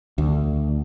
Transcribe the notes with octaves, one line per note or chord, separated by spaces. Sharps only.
D2